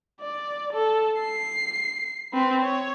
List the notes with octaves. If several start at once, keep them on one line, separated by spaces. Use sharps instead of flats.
D5
A4
C7
C4 B4
C#5